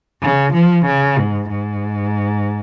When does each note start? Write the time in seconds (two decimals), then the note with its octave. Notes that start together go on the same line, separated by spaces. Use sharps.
0.22 C#3
0.54 F3
0.86 C#3
1.18 G#2
1.51 G#2